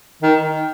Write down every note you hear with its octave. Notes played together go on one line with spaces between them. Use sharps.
D#3